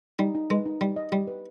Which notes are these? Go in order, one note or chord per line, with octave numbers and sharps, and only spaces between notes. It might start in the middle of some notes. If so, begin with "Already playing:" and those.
G3 D#4
D#4
G#3 B4
D#4
G3 D#4
D#5
G3 G4
B4